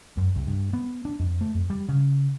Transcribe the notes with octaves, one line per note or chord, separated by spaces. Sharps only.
F#2
C2
G2
B3
D4
F2
A3
F2
G3
C#3